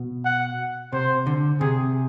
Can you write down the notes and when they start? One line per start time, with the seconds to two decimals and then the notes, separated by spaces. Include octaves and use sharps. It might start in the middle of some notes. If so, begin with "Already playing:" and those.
Already playing: B2
0.25 F#5
0.93 C3 C5
1.27 D3
1.61 C3 G#4